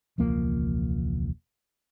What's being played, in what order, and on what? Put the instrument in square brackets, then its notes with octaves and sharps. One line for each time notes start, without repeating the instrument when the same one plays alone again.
[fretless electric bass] E1 C#2 F3 A#3